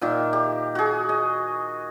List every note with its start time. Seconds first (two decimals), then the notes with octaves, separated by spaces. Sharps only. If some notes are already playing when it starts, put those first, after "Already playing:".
0.01 A#2 D#3 E5
0.33 G4
0.75 F#4 G#4
1.09 D#5